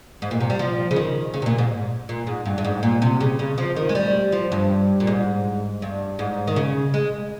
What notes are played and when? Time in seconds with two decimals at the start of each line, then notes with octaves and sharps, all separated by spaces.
0.22 G#2
0.31 A#2
0.40 C3
0.50 G3
0.59 F3
0.91 C#3
0.96 D#3
1.34 C#3
1.42 C3
1.46 A#2
1.58 G#2
2.09 A#2
2.27 G#2
2.45 G2
2.58 G2
2.64 G#2
2.83 A#2
3.02 C3
3.20 C#3
3.39 C#3
3.58 F3
3.76 D#3
3.89 G#3
3.95 G3
4.32 F3
4.52 G2
5.00 A#2
5.07 G#2
5.82 G2
6.19 G#2
6.47 D#3
6.56 C#3
6.94 G#3